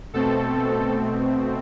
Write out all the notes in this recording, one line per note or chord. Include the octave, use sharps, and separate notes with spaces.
B2 A3 C4 A4